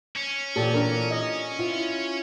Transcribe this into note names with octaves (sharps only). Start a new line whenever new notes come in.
C#4
A#2 E3 G4 A4 A5
D4 A#4
D#5
E4 F4